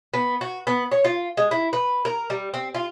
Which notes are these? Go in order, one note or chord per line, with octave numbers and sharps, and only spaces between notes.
B3
F#4
B3
C#5
F4
G#3
E4
B4
A#4
G3
C4
F4